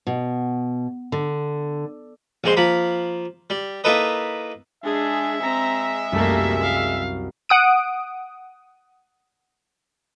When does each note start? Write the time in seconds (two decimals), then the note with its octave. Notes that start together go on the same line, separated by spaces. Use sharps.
0.07 B2
1.12 D3
2.44 A#1 G#3 C5 C6
2.57 F3 A#3 B5
3.50 G3
3.84 A#3 D#4 E4 A4 B4 D#5
4.84 G#3 D4 G#4 E5
5.42 C4 A#5
6.12 C2 F#2 G3 A3 A#3
6.63 F5
7.49 F#5 D#6 D7